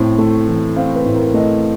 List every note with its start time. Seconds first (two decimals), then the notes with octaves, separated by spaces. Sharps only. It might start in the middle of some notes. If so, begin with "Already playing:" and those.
Already playing: A2 C4
0.19 A3
0.48 E3
0.76 C4 F5
0.96 B4
1.06 A2
1.14 A#4
1.34 A3 D#5